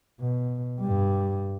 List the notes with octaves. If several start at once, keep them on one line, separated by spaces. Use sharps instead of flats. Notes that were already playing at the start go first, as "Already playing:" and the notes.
B2
G2 G3